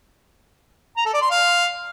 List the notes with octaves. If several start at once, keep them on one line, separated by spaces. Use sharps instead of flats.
A#5
A4
D5
C6
F5